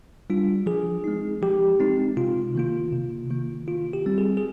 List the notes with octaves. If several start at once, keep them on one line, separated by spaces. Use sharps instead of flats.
G3 D4 F4
F3 G#4
G#3 C4 D#4
F3 G4
G#3 C4 D#4
C3 F4
D#3 A#3 F4
C3
D#3 A#3 F4
D#3 F4
G4
G3 C4
G#4
G#4